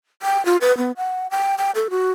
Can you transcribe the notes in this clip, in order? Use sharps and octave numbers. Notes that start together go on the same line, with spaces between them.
G5
F4
B4
B3
F#5
G5
G5
A4
F#4